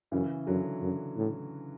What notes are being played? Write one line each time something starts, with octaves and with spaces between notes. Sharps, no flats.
F#2 C#3 E3
F#2 D3 F#3
F#2
A2